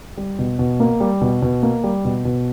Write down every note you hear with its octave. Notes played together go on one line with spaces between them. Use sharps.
G3
B2
B2
A#3
G3
B2
B2
A#3
G3
B2
B2